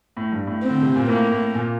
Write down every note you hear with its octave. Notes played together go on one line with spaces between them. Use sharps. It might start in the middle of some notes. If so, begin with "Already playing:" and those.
A2
G2
A2
C4
D3
C3
A#2
A2 A#3
A2
A#2